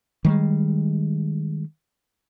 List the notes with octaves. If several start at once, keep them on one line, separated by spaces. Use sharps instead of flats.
D#3 G3 G#3